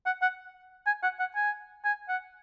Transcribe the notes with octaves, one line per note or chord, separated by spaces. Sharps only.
F#5
F#5
G#5
F#5
F#5
G#5
G#5
F#5